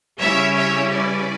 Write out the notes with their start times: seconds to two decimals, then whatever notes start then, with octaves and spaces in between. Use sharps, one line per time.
0.20 C#3 G3 C#4 E4 C#5 E5
0.56 C#5 E5
0.92 B4 D5